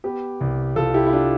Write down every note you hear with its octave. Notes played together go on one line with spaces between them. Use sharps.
B3 G4 B4
C2
C2 F4 A4
E4 G4
E4
D4 F4